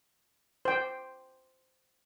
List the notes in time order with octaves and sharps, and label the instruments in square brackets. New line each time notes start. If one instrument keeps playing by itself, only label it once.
[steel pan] C5 G5